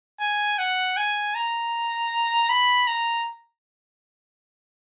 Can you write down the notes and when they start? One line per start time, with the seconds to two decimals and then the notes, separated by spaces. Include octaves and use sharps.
0.20 G#5
0.58 F#5
0.97 G#5
1.35 A#5
2.49 B5
2.87 A#5